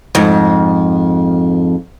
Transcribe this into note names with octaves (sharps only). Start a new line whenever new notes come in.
F2 G#2